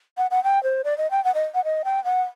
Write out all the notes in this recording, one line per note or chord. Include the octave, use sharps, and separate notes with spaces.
F#5
F#5
G5
C5
D5
D#5
G5
F#5
D#5
F#5
D#5
G5
F#5